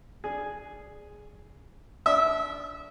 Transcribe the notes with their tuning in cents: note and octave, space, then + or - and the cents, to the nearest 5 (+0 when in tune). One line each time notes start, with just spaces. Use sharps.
D4 +0 G#4 +0 G#5 +0
D4 -20 E5 -25